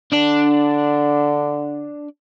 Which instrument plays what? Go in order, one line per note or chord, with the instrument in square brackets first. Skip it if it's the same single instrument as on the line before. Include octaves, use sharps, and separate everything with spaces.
[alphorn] D3 [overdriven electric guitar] D4 D5